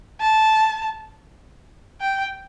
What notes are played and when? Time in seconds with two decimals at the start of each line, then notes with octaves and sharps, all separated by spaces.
0.21 A5
2.01 G5